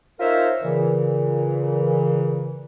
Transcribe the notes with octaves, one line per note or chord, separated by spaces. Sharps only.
D#4 F4 A#4 C5 C#5 E5
A#2 C#3 E3